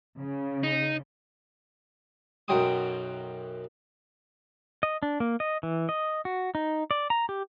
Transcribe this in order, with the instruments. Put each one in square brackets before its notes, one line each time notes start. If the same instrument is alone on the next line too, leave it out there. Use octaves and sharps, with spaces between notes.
[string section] C#3
[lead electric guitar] D#4
[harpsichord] B1 F#2 F#3 G5 C6 D#6
[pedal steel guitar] D#5
D4
A#3
D#5
E3
D#5
F#4
D#4
D5
A#5
G4